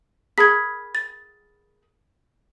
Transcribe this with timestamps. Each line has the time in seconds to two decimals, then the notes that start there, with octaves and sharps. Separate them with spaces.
0.38 G#4 A#4 B5 G#6 B6
0.95 A6